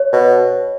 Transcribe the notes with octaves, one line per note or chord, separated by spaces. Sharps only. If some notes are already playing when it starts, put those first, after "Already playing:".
Already playing: C#5
B2